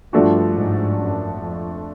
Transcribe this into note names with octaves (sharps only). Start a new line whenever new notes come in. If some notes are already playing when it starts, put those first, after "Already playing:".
G2 F3 A3 D4 F#4
G#2
F#2
F2